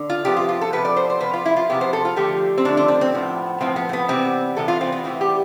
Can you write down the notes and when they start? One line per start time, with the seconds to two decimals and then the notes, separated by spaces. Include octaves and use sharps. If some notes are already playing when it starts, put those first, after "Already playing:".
Already playing: D3
0.10 F4
0.25 C3 F3 B3 G4
0.37 F4
0.49 F4
0.61 A4
0.73 C3 F3 B3 B4
0.85 D5
0.97 C5
1.10 C5
1.21 C3 F3 B3 B4
1.34 F4
1.46 E4
1.56 F4
1.70 C3 F3 B3 G4
1.81 C5
1.93 A4
2.05 F4
2.16 D3 F3 A3 G4
2.58 C4
2.65 D3 F3 A3 D4
2.77 D4
2.88 C4
3.01 C4
3.13 A2 F3 B3
3.60 A2 F3 B3 C4
3.76 B3
3.89 C4
3.93 B3
4.08 C3 E3 G3 B3 C4
4.56 C3 E3 G3 B3 A4
4.68 F4
4.81 C4
4.92 B3
5.04 A2 E3 G3 B3 C4
5.21 G4